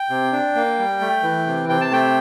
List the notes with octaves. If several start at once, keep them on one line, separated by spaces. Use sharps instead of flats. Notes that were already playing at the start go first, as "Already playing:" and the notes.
Already playing: G5
C3
D4
A#3
G3
A3
E3
C3
C3 G5
A5
A3 G5